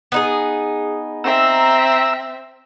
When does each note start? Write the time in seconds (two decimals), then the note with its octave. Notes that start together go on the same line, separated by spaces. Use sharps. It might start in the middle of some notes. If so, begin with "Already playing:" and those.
0.12 B3 D#4 G#4
1.24 C4 E5 A#5 E6